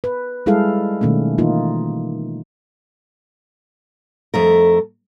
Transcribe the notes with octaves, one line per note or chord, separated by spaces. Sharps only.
B4
G3 G#3 E4 G#4 A4 F5
B2 D#3 A3 A#3 C#4
E3 A#3 D#4 F4
F2 A3 A#4